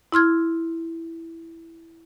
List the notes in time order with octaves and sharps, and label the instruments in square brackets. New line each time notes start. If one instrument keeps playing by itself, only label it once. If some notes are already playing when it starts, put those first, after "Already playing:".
[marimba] E4 C6 F6 G#6